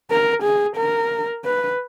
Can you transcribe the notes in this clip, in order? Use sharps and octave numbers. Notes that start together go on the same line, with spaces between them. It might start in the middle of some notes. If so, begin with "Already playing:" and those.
A#4
G#4
A#4
B4